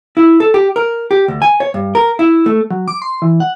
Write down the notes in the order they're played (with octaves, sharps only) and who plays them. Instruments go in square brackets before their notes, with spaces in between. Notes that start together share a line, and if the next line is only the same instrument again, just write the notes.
[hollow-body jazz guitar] E4
A4
G4
A#4
G4
D2
G#5
C#5
G2
A#4
E4
A3
[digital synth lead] F#3
D6
C6
E3
F#5